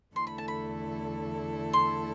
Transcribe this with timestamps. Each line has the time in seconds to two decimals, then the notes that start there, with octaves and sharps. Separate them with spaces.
0.16 E2 D3 A3 E4 A4 C6
0.27 B5
0.38 A5
0.48 B5
1.73 C6